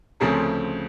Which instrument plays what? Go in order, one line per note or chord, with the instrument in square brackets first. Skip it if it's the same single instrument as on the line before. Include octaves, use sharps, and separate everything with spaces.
[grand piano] D2 C#3 F3 A3 C4 G#4 A#4